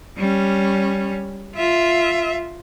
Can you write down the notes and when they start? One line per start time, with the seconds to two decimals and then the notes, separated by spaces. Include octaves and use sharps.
0.18 G3 C#4
1.56 F4 E5